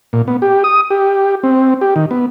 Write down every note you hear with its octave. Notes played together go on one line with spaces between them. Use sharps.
A#2
B3
G4
D#6
G4
C4
G4
D#3
B3